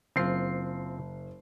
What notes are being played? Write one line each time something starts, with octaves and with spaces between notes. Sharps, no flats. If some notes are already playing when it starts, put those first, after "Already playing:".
F#1 C4 F4 C7